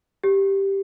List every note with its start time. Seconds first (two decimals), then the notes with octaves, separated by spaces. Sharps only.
0.24 G4